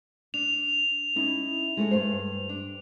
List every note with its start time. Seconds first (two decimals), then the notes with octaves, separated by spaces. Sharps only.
0.34 D4 F7
1.16 C#4 D#4 E4
1.77 G#3 A3 C#5
1.91 G2 C5
2.49 D4